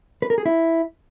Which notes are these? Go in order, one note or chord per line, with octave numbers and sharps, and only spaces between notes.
B4
A#4
G#4
E4